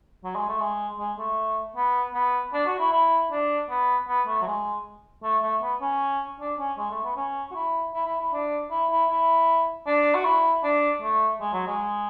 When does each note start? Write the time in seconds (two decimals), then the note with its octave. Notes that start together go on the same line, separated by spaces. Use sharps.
0.24 F#3
0.35 G#3
0.48 A3
0.60 G#3
0.99 G#3
1.18 A3
1.76 B3
2.15 B3
2.53 D4
2.66 F#4
2.79 E4
2.92 E4
3.31 D4
3.70 B3
4.08 B3
4.27 A3
4.42 F#3
4.46 G#3
5.23 A3
5.42 A3
5.62 B3
5.81 C#4
6.40 D4
6.59 C#4
6.78 G#3
6.91 A3
7.04 B3
7.16 C#4
7.51 F#4
7.55 E4
7.94 E4
8.06 E4
8.20 E4
8.33 D4
8.71 E4
8.90 E4
9.10 E4
9.86 D4
10.15 F#4
10.25 E4
10.63 D4
11.02 A3
11.40 G#3
11.53 F#3
11.67 G#3